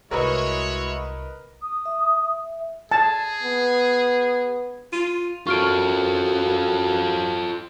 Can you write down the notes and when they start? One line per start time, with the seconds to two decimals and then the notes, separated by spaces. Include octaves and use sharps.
0.11 C2 G#3 E4 F#4 A#4 B4 C#5 D#5
1.61 D#6
1.86 E5
2.91 G#4 A5
3.43 B3
4.93 F4 D#7
5.47 F#2 F4 A4 C#6 F6 D7